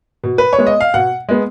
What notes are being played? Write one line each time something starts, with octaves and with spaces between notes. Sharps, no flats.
B2
B4
C#5
G#3 B3
D#5
F5
B2 F#5
G#3 B3